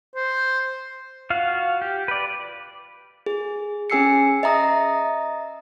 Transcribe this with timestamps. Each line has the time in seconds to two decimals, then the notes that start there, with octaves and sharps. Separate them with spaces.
0.15 C5
1.30 F4 F#4 F5
1.81 G4
2.08 B4 D5
3.26 G#4
3.90 C#4 G#4 G#5 E6 C7 C#7
4.43 D#5 E5 A#5 D#6